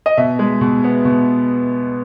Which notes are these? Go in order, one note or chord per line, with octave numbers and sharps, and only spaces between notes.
D#5
B2 E5
G#3
B2
B3
B2